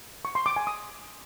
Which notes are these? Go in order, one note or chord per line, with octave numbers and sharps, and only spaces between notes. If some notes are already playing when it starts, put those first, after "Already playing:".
C#6
C6
D6
G#5
D#6